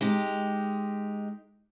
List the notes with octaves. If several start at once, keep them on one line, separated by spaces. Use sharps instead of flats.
G#3 D#4 G4